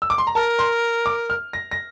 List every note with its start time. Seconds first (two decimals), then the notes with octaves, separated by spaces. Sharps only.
0.02 E6
0.10 D6
0.18 C6
0.27 A#5
0.35 A#4 A5
0.59 C6
1.06 D6
1.30 F6
1.53 A#6
1.71 A#6